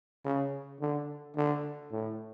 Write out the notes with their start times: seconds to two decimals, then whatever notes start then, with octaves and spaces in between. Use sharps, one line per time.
0.25 C#3
0.81 D3
1.36 D3
1.92 A2